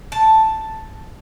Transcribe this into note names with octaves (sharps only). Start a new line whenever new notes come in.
A5